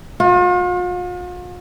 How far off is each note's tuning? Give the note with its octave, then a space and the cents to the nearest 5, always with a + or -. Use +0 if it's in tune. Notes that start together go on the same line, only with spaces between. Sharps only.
F4 +45